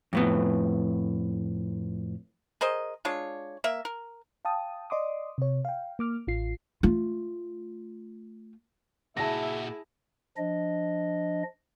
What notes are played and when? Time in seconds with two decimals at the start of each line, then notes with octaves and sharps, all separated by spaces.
0.13 F2 A2 B3
2.61 G#4 A#4 C5 D#5
3.05 G#3 D4 F4 C#5
3.64 A#3 E5
3.85 A#4
4.45 F5 G5 A5 D#6
4.90 D5 D#5 C6 D6 D#6
5.38 C3 C#5
5.65 F5 G5
5.99 A#3 D6 F6
6.27 A1 F4 C7
6.83 A3 F4
9.17 A#2 E4 F#4 G#4 E5 A5 A#6
10.37 F3 D4 D#5